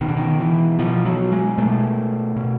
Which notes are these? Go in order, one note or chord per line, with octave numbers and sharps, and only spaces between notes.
B2 D#3
D3
D#3
E3
B2 F3
F#3
G#3
B2 A3
B2